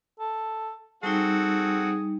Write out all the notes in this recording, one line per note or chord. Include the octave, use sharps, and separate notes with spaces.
A4
G3 C4 D#4 F#4 G#4 A4